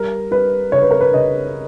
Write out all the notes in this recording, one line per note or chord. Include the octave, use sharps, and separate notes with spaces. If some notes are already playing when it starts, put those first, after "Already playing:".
Already playing: G3 A#4
G3 B4
C#3 C#5
B4
A#4
B4
C#3 D#5